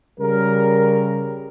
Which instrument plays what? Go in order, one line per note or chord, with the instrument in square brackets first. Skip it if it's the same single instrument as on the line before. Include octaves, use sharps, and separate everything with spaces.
[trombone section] C#3 G3 A#4